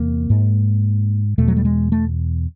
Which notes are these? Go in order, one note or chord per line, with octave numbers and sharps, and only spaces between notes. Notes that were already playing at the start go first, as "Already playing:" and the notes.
Already playing: E2 C3 A#3
G#2
E2 B2 A3
F#3
G3
G#3
A3